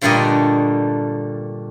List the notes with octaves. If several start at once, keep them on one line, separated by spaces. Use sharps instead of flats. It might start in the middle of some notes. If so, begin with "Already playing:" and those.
G2 A#2 D3 G3 A3 D#5